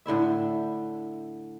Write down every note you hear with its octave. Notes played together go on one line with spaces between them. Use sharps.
A2 D3 E4 E5